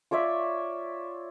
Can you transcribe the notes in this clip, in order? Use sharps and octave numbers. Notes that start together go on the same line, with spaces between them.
F4 C#5 D5 E5